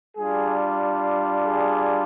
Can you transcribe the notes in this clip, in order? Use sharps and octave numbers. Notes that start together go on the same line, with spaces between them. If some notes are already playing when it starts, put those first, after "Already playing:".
G3 D4 F4 G#4
G#4